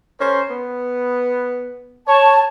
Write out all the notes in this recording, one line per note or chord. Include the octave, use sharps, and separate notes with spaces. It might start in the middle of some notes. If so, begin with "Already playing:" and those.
C#4 A#4 C5
B3
C#5 A5